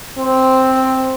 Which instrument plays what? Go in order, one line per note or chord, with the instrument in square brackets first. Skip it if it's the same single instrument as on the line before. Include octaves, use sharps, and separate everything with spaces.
[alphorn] C4